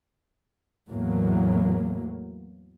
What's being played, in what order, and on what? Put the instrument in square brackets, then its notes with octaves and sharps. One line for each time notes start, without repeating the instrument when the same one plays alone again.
[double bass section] E2 A2 F#3 A#3